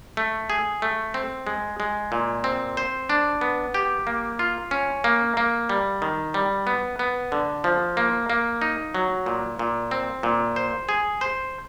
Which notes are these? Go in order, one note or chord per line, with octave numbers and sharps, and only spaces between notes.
A3
G#4
A3
C4
G#3
G#3
A#2
C4
C5
D4
B3
G4
A#3
F4
C#4
A#3
A#3
G3
D#3
G3
B3
B3
D3
F3
A#3
A#3
D#4
F#3
A#2
A#2
C4
A#2
C5
G#4
C5